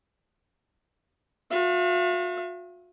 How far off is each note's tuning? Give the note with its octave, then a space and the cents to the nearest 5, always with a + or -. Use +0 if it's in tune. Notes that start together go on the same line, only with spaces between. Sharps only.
F#4 -45 E5 +45